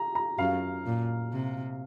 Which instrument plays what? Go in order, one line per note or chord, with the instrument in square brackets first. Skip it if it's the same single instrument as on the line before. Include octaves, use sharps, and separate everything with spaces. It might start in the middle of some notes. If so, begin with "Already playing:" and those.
Already playing: [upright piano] A#5
A#5
[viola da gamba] F#2 [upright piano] F5
[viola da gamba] A#2
C3